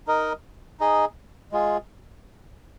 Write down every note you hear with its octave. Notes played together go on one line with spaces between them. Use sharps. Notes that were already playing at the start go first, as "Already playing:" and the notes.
D#4 A#4 D#5
D#4 G#4 D#5
G#3 F4 G#4